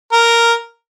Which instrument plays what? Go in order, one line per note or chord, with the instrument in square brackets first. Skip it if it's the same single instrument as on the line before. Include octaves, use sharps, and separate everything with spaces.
[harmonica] A#4